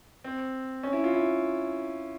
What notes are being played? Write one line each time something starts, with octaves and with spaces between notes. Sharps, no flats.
C4
C#4
E4
F4
E4